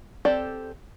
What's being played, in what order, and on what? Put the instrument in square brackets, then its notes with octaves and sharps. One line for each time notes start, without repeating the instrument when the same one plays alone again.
[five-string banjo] C4 G4 A4 D5